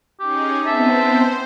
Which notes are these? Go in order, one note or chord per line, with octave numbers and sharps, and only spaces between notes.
C#4 D#4 G4 G#4
B3 C4 C5 E5 A5